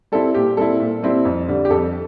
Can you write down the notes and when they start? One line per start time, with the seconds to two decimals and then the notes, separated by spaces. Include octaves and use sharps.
0.12 G3 C4 E4 A4
0.34 A#2 G4
0.57 G3 C4 E4 A4
0.80 A#2
1.03 G3 C4 E4
1.25 F2
1.48 D3 G3
1.65 G4
1.70 F2 A4